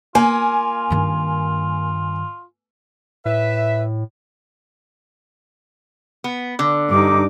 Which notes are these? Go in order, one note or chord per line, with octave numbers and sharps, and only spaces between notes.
A#3 F4 G#5
G2 D#3
A2 B4 E5
B3
D3
G2 D#4 D6